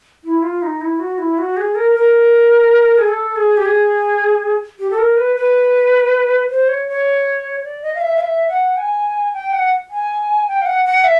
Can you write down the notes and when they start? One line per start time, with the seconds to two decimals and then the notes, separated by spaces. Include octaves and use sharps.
0.24 E4
0.42 F4
0.62 D#4
0.81 E4
0.99 F#4
1.18 E4
1.38 F#4
1.57 G#4
1.75 A#4
1.95 A#4
2.98 G#4
3.08 A4
3.36 G#4
3.57 G4
3.66 G#4
4.79 G4
4.91 A4
4.98 A#4
5.17 B4
5.36 B4
6.50 C5
6.68 C#5
6.88 C#5
7.64 D5
7.82 D#5
7.95 F5
8.01 E5
8.16 F5
8.21 E5
8.48 F#5
8.77 G#5
9.34 G5
9.53 F#5
9.91 G#5
10.48 G5
10.62 F5
10.66 F#5
10.85 F#5
11.04 E5